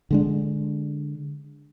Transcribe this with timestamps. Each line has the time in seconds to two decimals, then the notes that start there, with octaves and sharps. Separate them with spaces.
0.11 D3 G#3 D4